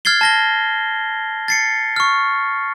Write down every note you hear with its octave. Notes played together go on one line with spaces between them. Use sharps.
F6 G#6 A6 C7 G7
A5 A#6 G7
A6 C7 C#7
C#6 F6